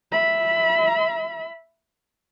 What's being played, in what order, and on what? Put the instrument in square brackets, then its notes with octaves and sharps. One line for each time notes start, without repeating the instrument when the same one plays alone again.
[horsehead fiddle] E5 B5